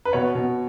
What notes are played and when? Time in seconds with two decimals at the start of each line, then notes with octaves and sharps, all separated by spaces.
0.05 B4
0.13 B2 C#5
0.35 B2